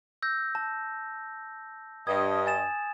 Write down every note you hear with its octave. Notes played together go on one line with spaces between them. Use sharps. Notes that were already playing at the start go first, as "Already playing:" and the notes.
E6 G6 A#6
A5
G2 D#5 D#6 G#6
G#5 A6 E7